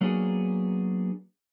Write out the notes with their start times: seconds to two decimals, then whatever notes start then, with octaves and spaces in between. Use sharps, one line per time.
0.01 F#3 A#3 B3 D4 F#4 G#4